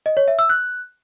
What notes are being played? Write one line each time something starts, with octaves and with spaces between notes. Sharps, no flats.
D#5
C#5
E5
E6
F#6